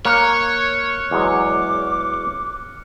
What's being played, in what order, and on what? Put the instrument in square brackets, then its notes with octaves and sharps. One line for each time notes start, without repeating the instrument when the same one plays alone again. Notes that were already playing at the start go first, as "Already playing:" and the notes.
[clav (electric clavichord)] A#3 [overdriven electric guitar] C#5 [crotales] F6 F#6 C#7
[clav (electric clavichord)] E2 F#3 G#3 [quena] D6